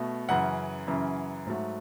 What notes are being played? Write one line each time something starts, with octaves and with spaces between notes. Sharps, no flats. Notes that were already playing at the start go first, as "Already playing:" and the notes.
Already playing: B2 A3
F#2 C#3 E3 F#5
F#2 C#3 E3
G#2 F#3 A3